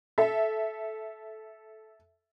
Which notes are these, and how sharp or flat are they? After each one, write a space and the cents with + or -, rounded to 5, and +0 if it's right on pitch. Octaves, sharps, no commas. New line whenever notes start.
A4 -15 E5 +0